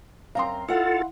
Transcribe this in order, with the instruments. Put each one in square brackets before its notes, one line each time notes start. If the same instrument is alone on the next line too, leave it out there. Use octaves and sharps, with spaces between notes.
[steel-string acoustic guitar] F#2 C4 A#5 [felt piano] F5 C6
[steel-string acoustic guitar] E4 F#5 [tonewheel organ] F4 A4